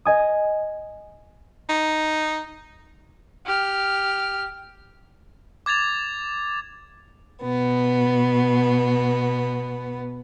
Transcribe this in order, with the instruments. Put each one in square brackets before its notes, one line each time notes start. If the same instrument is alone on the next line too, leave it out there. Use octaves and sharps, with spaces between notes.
[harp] D#5 G#5 D#6
[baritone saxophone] D#4
[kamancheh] G4 F6
[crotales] D6 G#6 A6 F7
[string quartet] B2 B3